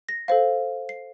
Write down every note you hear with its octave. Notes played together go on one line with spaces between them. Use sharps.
A#6
A4 C5 F5
C7